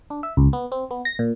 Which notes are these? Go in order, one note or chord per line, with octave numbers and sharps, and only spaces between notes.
D4
E5
C#2
B3
C4
B3
A#6
A#2